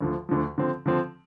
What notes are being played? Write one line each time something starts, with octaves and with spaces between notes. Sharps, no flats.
D2 D3 F3
D2 D3 F3
D3 F3 C4
D3 F3 C4